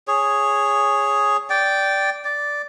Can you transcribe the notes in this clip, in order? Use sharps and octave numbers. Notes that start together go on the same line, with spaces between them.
G#4 C#5
D5 G5
D5